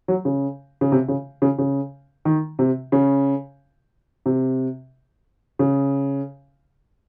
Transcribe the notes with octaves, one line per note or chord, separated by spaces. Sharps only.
F#3
C#3
C#3
C3
C#3
C#3
C#3
D#3
C3
C#3
C3
C#3